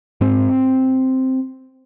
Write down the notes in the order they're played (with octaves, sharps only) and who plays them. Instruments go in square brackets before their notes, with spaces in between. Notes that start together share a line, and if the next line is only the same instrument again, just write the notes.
[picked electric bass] G#2 C4